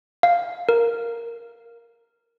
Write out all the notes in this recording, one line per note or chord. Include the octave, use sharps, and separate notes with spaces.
F5
A#4